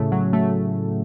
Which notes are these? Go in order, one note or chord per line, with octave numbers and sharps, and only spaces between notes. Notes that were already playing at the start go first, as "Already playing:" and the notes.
Already playing: A2 C#3 A3
F#3
A3